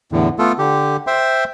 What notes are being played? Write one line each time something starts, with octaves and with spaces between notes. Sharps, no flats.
E2 A2 D3
A3 B3 F4 A4
D3 G4
C5 E5 G5 C6